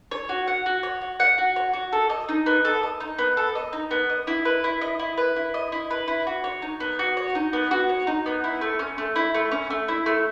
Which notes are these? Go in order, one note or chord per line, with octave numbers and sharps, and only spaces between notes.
C#5
F#4
F#5
F#4
C#5
F#4
F#5
F#4
C#5
F#4
A4
D#5
D#4
B3
A4
D#5
D#4
B3
A4
D#5
D#4
B3
D#5
E4
B4
E4
D#5
E4
B4
E4
D#5
E4
B4
E4
F#4
C#5
D#4
B3
F#4
C#5
D#4
B3
F#4
C#5
D#4
B3
E4
A3
C#4
A3
E4
A3
C#4
A3
E4
A3